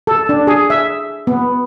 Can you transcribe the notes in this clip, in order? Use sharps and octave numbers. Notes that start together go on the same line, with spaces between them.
A4
D4
G#4
E5
B3